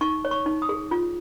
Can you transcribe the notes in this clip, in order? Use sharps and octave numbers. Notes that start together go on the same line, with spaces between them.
D#4 C#6
C#5
C#6
D#4
D#6
G#4
F4